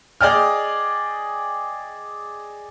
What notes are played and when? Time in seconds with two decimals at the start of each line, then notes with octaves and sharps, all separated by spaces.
0.21 G#4 D5 D#5 G5 F6